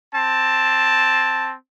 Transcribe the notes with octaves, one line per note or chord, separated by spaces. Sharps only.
C4 A5